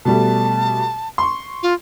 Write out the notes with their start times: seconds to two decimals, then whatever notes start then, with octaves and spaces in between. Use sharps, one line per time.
0.05 B2 G3 A3 A5
1.18 C6 C#6
1.63 F4